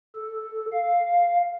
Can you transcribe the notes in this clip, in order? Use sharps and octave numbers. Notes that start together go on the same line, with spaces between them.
A4
F5